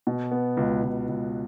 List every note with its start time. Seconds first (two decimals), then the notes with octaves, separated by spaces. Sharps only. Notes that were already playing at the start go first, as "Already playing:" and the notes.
0.07 B2
0.31 B3
0.57 C#2
0.83 C#2
1.08 C#2